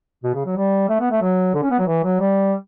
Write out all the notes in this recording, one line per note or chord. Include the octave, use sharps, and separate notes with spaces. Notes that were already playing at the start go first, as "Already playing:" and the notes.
B2
C#3
F#3
G3
A3
B3
A3
F#3
D3
C#4
B3
F#3
E3
F#3
G3